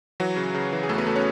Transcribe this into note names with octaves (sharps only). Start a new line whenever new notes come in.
E3 F#3 F#4
C#3
C#3
E3
G#4
E2 A3 A4
B3 B4
C#3 A3 A4
C#4 C#5